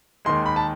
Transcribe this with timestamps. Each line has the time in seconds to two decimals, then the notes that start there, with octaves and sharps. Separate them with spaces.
0.25 D#2 D#3 G#3 C6
0.46 B5
0.56 A5